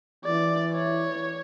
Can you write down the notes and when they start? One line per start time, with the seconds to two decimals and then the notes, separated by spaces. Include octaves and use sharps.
0.25 E3 D5
0.73 C#5